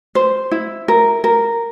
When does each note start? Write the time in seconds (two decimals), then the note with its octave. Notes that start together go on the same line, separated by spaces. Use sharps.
0.15 C5
0.51 E4
0.88 A#4
1.24 A#4